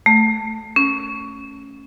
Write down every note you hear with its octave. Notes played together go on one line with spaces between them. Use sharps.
A3
C#4